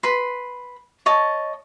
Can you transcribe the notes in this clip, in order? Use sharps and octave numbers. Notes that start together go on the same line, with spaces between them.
B4 B5 C6
C#5 D#5 A5